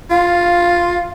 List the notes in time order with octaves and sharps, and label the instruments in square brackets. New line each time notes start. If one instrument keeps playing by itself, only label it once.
[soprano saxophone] F4 [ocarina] F5